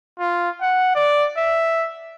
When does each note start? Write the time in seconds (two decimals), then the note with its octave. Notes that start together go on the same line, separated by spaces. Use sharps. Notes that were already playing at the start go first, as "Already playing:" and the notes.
0.20 F4
0.61 F#5
0.96 D5
1.37 E5